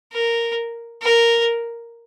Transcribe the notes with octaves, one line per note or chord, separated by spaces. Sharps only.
A#4
A#4